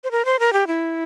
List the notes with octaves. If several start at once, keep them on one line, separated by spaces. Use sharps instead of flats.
C5
A#4
C5
A#4
G4
E4